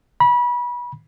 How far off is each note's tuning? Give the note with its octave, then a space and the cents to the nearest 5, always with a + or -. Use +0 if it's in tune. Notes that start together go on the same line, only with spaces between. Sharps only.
B5 -30